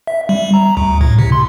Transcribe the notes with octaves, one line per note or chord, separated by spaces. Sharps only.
E5
G3
A#5
D2
A2
C3
C6